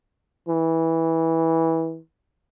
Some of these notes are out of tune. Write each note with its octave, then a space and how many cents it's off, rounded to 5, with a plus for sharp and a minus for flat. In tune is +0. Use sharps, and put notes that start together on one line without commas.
E3 -15